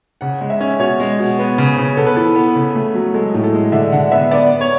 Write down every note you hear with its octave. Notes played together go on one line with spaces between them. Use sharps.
C#3 F#5
G#3
E5
C#4
B2 C#5
G#3
B2
B3
C#3
C#3
B3 A4
B4
E3 A4
B3
C#3
A3
F#3
G#3 A4
A2
A4
G#3
D3 E5
D3 F#5
B3 E5
B3 D5
B3
C#5